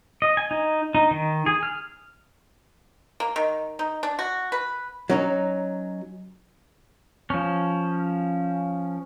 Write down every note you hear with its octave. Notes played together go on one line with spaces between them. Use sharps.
D#5
G#5
D#4
D#4
D#3
G#4
F6
A#3
D#3
D#4
D4
F#4
B4
F#3 C#4 D#4
F3 C#4